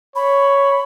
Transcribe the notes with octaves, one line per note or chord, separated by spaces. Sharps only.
C#5 B5